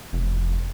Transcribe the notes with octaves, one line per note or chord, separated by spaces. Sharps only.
F1